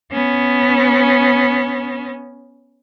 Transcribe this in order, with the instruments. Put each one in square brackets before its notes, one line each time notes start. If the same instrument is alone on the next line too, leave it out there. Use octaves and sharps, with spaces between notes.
[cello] B3 C#4